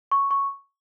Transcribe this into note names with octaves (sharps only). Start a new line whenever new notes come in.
C#6
C#6